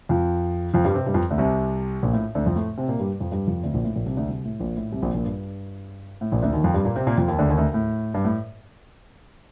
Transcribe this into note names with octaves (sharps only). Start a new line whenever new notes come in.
F2 F3
F2 F3
G2 G3
C3 C4
G2 G3
F2 F3
D2 D3
C2 C3
A#1 A#2
A2
D2 D3
F2 F3
A2 A3
C3 C4
A#2 A#3
G2 G3
F2 F3
G2 G3
F2 F3
D2 D3
A#1 A#2
A2
A#1 A#2
C2 C3
D2 D3
C2 C3
A2
A#1 A#2
A2
C2 C3
A#1 A#2
A#1 A#2
G2
A2
A#1 A#2
D2 D3
D#2 D#3
F2 F3
G2 G3
A#2 A#3
C3 C4
A#2 A#3
F2 F3
D#2 D#3
D2 D3
D#2 D#3
D2 D3
A2
G2
A2